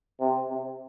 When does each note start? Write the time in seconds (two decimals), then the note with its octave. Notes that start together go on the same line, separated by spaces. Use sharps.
0.20 C3
0.49 C3